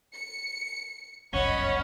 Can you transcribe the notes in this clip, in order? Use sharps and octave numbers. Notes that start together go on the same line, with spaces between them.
C#7
G1 C#2 F#2 C#4 C#5 D#5 F#5 B5